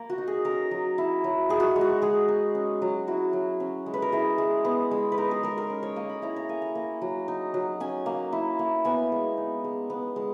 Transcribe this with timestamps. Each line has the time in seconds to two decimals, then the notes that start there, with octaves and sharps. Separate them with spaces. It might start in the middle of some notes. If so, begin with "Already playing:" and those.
Already playing: A#3 A#4
0.10 F#4
0.18 D#4
0.28 G#4
0.45 C#4 A#4
0.71 F#3
0.98 E4
1.24 F#3
1.49 D#4 G#4
1.60 F#4
1.76 G#3
1.81 F#4
2.02 G#3 G#4
2.28 D#4
2.55 C#4
2.82 F#3
3.07 E4 F#4
3.33 F#3
3.60 C#4
3.86 G#3
3.94 B4
4.02 A#4
4.12 E4 G#4
4.38 G#3
4.65 B3
4.91 G#3
5.12 B4
5.18 D#4 A#4
5.31 G#4
5.43 G#3 A#4
5.58 A#4
5.70 C#4
5.83 C#5
5.96 A#3 D#5
6.09 B5
6.22 E4 A#5
6.36 A#5
6.49 A#3 G#5
6.62 A#5
6.75 A#3
7.02 F#3
7.28 D#4
7.54 F#3
7.80 C#4 G#5
8.06 A#3
8.33 E4
8.59 A#3
8.85 B3 G#5
9.12 G#3
9.37 D#4
9.64 G#3
9.90 B3
10.16 G#3